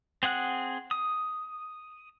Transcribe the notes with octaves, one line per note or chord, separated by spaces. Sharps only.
C4 G#4 F#5 F#6
D#6